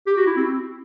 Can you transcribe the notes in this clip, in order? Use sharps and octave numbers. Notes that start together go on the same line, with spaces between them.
G4
F#4
E4
C4